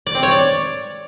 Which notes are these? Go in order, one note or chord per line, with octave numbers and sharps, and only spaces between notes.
D5
C4
C#5
D5